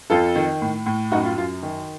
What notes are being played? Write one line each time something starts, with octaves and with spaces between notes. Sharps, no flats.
F2 F4 A4
D#3
A2
A2
F#2 D#4 F#4
F4
F#2 F4
D#3